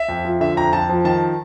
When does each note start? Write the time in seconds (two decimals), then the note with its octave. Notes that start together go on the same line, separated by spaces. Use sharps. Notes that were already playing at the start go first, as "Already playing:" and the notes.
Already playing: E5
0.08 F2
0.25 F3
0.40 D3 E5
0.57 F2 A#5
0.73 F2 A5
0.89 F3
1.04 D#3 A5